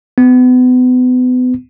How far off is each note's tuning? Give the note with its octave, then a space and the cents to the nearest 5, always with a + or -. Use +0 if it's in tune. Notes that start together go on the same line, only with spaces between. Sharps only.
B3 +35